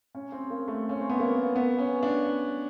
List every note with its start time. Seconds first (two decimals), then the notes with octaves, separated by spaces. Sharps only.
0.15 C#4
0.32 C4
0.50 A#3
0.68 A3
0.89 C#4
1.00 C4
1.10 B3
1.20 A#3
1.56 B3
1.78 C#4
2.03 D4